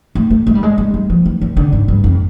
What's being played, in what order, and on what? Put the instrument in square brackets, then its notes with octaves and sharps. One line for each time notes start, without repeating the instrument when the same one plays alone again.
[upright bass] A3
A3
G#3
G3
G#3
G#3
G3
F3
E3
D#3
D3
G#2
G2
F2